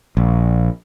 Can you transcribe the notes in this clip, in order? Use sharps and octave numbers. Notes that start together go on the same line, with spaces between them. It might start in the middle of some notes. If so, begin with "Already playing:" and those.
A#1